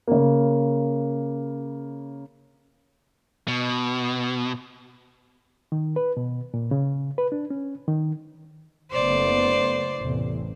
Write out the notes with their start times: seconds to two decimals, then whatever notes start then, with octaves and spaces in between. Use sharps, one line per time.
0.08 C#3 A#3
3.48 B2
5.72 D#3
5.96 B4
6.17 B2
6.54 A#2
6.71 C#3
7.18 B4
7.32 D4
7.50 C#4
7.88 D#3
8.91 F#1 A3 B3 C5 D5
9.99 A1 E2 C3